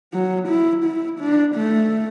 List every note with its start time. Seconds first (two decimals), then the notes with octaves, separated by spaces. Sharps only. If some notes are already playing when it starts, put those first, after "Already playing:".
0.13 F#3
0.48 E4
0.85 E4
1.20 D4
1.55 A3